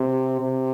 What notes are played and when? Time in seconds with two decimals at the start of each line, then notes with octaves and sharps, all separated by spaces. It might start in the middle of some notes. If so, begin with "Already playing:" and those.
Already playing: C3
0.41 C3